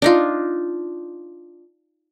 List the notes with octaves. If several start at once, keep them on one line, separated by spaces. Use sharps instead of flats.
D4 D#4 F4